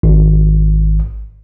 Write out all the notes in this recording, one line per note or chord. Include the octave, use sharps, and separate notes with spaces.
G#1